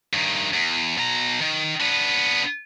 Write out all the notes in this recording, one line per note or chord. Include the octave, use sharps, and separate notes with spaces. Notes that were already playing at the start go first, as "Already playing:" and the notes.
G2 D#3
E2
B2 A#5
D#3
B3 D4